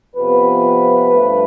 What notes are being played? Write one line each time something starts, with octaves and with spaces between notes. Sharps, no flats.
F2 C3 F3 B3 B4
G2 F3 A3